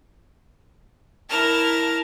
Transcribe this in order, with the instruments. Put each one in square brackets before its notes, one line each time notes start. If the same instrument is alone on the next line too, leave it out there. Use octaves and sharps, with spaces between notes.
[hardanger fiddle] E4 A5 [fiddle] A#4 F6